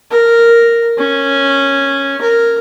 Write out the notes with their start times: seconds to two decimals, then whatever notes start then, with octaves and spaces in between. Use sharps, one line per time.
0.11 A#4
0.98 C#4
2.21 A#4